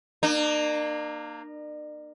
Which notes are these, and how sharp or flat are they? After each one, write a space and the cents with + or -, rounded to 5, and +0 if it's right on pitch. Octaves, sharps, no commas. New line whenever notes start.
A#3 +0 D4 +45